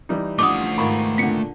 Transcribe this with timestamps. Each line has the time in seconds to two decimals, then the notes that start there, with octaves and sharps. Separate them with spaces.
0.09 E3 G3 D#4
0.39 F3 A3 C#4 D4 F#5 D6 D#6
0.78 G#2 D#3 B3 F4 B5 C#6
1.18 A#2 D3 B6 C#7